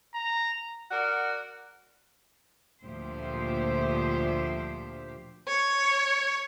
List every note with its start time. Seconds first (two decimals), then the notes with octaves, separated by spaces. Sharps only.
0.14 A#5
0.91 F#4 A#4 D5 F#5
2.84 D2 A#2 F3 G4 C5 E5
5.48 C#5